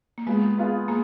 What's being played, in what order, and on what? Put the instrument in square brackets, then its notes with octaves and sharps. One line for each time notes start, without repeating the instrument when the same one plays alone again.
[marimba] A#3
[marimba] G#3 [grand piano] B3 F4 G#4
[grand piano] B3 F4 G#4
[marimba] A#3 [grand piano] G#4